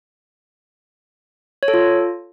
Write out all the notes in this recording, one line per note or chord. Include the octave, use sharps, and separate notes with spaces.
C#5
A4
F4